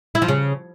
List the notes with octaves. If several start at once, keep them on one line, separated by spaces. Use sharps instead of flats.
E4
F3
C#3